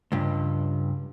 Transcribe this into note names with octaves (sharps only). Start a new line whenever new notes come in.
C#2 G2